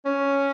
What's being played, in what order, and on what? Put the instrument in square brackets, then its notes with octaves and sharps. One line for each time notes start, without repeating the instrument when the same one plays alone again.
[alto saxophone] C#4